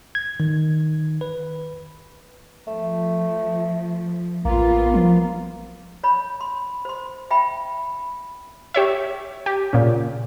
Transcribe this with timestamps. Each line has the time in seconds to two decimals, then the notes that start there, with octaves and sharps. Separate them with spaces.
0.15 G#6
0.40 D#3
1.21 B4
2.67 F3 A3
4.45 A1 A#3 B3 F4
4.94 F3
6.04 C#5 B5
6.41 C6
6.85 C5 C6
7.31 E5 G5 B5
8.74 G4 C#5 E5
9.46 G4
9.73 A#2 C#3